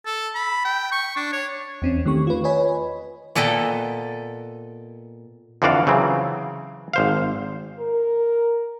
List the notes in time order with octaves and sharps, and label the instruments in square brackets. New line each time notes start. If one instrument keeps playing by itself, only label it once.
[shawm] A4
B5
G5
C#6
D4
C#5
[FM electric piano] E2 C4 C#4
D#3 A3 G4 C#6
F4 B4
B4 C#5 D#5 G#5 B5
[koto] A#2 B3 A4 D#5 G5
[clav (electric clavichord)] F2 D3 E3 F#4 D5 F5
C#3 E3 F#3 C4
G#1 C5 F5
[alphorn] A#4